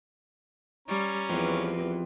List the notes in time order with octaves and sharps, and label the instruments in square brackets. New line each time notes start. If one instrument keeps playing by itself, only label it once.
[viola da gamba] G3 [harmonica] C#4 A#5
[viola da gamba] E2 G4 B4 [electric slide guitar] F3 C4